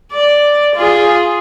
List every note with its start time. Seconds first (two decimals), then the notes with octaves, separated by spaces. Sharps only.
0.12 D5
0.75 F4 G#4